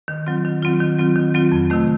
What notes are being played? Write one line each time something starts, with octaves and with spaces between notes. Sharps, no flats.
D#3
F#3 C4 F4
D#3
F#3 C4 F4
D#3
F#3 C4 F4
D#3
F#3 C4 F4
F2
C3 D#3 A3